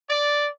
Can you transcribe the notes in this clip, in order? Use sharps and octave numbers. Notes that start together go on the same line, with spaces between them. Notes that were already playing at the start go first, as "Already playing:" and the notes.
D5